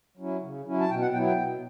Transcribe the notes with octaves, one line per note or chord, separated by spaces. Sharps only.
F#3 C#4 E4
C#3
F#3 C#4 E4
A5
B2 G5
F#5
F#3 B3 E4 G5
G5
B2